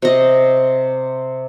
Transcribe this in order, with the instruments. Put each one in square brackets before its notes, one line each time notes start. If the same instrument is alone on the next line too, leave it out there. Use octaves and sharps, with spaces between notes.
[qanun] C3 D#5